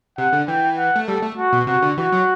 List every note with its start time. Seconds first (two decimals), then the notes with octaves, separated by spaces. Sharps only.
0.18 C3 F#5
0.33 D3
0.48 E3 G5
0.78 F#5
0.96 A3
1.07 G3 A4
1.22 A3
1.38 F#4
1.53 B2
1.67 C3 F#4
1.83 D3
1.97 E3 F#4
2.12 F#3